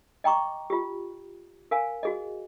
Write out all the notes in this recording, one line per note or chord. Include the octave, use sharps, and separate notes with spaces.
D#5 G5 A#5 C#6 D6
F4 G4
A#4 F5 G#5
F#4 G#4 D#5